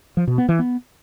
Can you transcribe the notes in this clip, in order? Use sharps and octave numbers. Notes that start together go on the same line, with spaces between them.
F3
B2
B3
E3
B3